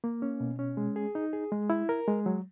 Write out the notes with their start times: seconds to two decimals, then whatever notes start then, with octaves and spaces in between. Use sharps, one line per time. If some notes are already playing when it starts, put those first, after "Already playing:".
0.04 A#3
0.22 C#4
0.40 B2
0.59 C#4
0.77 G#3
0.96 G#4
1.15 D#4
1.33 G#4
1.52 G#3
1.70 E4
1.89 A#4
2.07 G#3
2.26 F#3